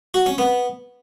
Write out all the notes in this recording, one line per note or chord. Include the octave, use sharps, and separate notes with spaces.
F#4
C#4
B3